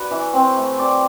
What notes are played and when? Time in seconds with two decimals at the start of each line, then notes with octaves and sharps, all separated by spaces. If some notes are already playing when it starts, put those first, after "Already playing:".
Already playing: D4 F#4 B4
0.11 E3
0.34 C4
0.56 A3
0.79 D5